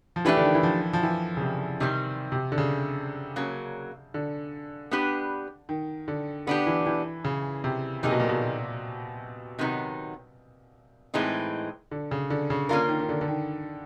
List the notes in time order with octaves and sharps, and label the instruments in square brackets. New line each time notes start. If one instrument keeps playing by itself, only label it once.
[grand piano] F3
[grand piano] E3 [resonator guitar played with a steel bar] A3 D4 G4 B4
[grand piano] D3
D#3
E3
F3
F3
E3
C#3
C3
[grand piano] C3 [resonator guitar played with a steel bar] D#3 G3 C4
[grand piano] C3
D3
C#3
[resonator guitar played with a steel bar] C#3 F#3 A#3
[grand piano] D3
[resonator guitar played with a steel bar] B3 D4 G4 B4
[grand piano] D#3
D3
[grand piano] D3 [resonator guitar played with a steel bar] B3 D4 G4
[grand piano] E3
E3
C#3
C3
[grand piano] C3 [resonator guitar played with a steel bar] D#3 F#3 A#3 D#4 G#4
[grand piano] B2
A#2
B2
[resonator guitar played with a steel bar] C3 D#3 F#3 B3 D#4
A2 E3 G#3 C4 D#4
[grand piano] D3
C#3
D3
C#3
[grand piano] D3 [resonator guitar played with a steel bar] A#3 C#4 F4 A#4
[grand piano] D#3
D#3
D3
D3
D#3